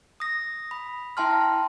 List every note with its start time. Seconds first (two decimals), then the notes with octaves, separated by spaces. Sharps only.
0.20 D#6 A#6
0.71 B5
1.17 E4 E5 G5 A5 C6 F6